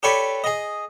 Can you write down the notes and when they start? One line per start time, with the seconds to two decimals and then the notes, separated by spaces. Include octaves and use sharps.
0.03 G4 A4 B4 C#5 D5 C#6
0.44 G#4 D#5